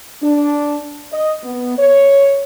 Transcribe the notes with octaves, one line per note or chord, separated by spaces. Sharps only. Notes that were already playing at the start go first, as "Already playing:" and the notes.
D4
D#5
B3
C#5